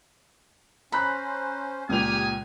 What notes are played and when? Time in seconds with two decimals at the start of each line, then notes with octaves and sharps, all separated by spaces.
0.92 C#4 C5 A#5 B5 F#6
1.89 C#2 A#2 G4 G#5 D#6 F6 F7